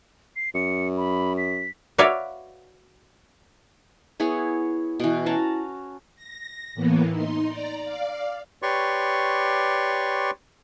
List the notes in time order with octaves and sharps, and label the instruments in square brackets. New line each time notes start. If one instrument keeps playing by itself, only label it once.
[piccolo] C7
[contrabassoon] F#2 [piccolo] C#7
[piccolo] B5
B6
[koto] F#4 B4 C#5 D5 E5 F5
[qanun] B3 E4 G#4 C#5
B2 E3
C#4 F#4 A5 A#5
[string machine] A#6
A2 E3 A#3 B3
D#4 C6
D5 A#5
D5 F5
[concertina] G4 B4 C#5 D5 C6 C#6